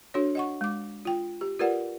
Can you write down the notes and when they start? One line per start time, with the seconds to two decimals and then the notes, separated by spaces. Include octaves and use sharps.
0.14 D4 F#4 A4 C#5
0.35 D#5 F#5 C#6
0.61 G#3 D6
1.05 F4 G5
1.41 G4
1.59 F4 G4 A#4 B4 D5 F#5